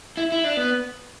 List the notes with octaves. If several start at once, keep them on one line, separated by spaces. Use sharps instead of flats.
E4
E4
D4
B3